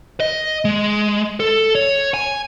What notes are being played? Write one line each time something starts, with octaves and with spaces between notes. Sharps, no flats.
D#5
G#3
A4
C#5
G#5